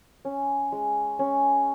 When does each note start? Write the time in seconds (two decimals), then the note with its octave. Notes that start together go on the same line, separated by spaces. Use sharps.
0.25 C#4
0.72 G#3
1.19 C#4